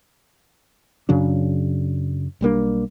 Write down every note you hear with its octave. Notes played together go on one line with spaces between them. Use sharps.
F#2 C#3 F#3 D4
B1 G3 A#3 D4